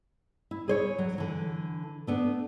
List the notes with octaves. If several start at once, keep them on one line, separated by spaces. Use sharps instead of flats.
E4
G#4 C5 C#5
F#3
D3 E3
A3 B3 D4